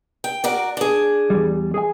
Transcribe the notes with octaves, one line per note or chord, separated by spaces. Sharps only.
G5
F#4 A#4 D5
D4 G#4
E2 G3
G#4 G#5